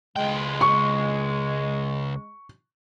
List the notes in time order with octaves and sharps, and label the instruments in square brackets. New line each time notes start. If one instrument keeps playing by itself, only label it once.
[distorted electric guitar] C#2 G5 [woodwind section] G#3
[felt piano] C#6